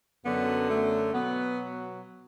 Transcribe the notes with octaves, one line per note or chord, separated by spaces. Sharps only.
F#2 D3 F#3 B3
A3
B2 F#3 B3